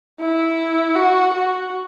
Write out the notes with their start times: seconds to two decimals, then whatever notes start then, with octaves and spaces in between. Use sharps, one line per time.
0.20 E4
0.96 F#4
1.34 F#4